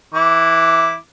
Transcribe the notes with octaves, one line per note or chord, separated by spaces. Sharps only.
E3 E4 D6